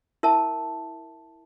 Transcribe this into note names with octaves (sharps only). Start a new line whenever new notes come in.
E4 A#4 E5 A5